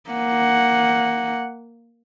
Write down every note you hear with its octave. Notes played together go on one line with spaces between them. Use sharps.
A#3 F#5